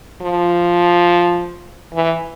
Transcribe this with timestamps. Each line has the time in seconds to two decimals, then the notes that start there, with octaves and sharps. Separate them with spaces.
0.22 F3
1.94 E3